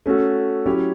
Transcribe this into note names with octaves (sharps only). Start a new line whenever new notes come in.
A3 C#4 F#4 A4
F#3 C#4 E4 G4 C#5